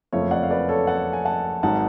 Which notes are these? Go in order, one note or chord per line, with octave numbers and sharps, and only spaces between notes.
F#1 F2 F3 A3 C#5 F5
D5 F#5
F5
B4 D5
A4 C#5
F#5 A5
G#5
F#5 A5
G#1 G#2 F#3 F#5 A5